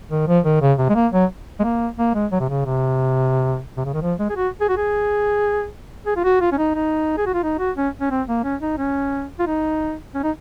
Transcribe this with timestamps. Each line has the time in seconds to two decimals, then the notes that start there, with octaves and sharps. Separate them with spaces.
0.11 D#3
0.28 F3
0.45 D#3
0.61 C#3
0.78 C3
0.89 G#3
0.95 A#3
1.13 F#3
1.60 G#3
1.64 A#3
1.98 A#3
2.14 G#3
2.32 F#3
2.40 C3
2.49 C#3
2.65 C3
3.77 C3
3.85 C#3
3.94 D#3
4.02 F3
4.19 G#3
4.29 G#4
4.36 F#4
4.61 G#4
4.69 F#4
4.77 G#4
6.06 G#4
6.16 F4
6.24 F#4
6.41 F4
6.52 C#4
6.58 D#4
6.75 D#4
7.17 G#4
7.26 F#4
7.34 F4
7.43 D#4
7.59 F#4
7.77 C#4
8.01 C#4
8.10 C4
8.28 A#3
8.44 C#4
8.61 D#4
8.78 C#4
9.39 F4
9.47 D#4
10.15 C#4
10.23 D#4